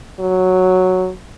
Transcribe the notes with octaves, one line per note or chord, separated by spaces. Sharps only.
F#3